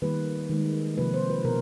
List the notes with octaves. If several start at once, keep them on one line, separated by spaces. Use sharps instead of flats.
D#3 G3 A#3 B4
D#3 G#3
C3 F3 A#3 B4
C5
B4
B2 A#4